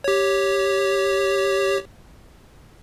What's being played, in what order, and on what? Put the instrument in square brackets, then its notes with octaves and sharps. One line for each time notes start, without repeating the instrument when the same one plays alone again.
[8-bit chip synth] G4 C#5